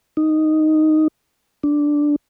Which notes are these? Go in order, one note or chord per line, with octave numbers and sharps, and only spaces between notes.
D#4
D4